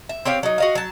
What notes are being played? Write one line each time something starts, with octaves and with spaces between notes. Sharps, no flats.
E5
C4 G4 C#5 F5
F#3 D#4
F#4 D#5 F5
F#3 A5